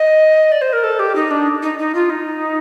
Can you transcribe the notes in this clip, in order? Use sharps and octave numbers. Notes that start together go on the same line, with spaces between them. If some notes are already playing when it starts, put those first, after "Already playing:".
Already playing: D#5
D5
C5
A#4
A4
G4
D#4
D4
D#4
D#4
F4
D#4